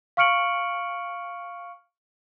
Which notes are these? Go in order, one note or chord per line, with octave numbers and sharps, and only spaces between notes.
F5 C#6 F6 C#7 D7 F#7